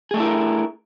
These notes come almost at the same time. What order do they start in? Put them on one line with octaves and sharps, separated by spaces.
G#4 A3 D4 E4 A#4